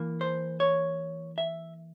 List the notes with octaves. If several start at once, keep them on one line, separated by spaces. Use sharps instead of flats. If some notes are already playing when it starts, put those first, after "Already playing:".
Already playing: E3 A#3
C5
C#5
E5